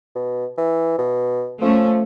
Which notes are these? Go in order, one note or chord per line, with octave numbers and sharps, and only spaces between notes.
B2
E3
B2
F3 A3 C#4